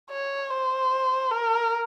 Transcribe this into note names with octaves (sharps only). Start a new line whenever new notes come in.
C#5
C5
A#4